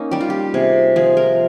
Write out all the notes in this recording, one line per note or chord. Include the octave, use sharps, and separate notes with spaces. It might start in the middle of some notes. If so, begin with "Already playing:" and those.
Already playing: A#3 C#4 D#4
G3 G4
F4
G4
C3 G#4
F3 G#4
A#4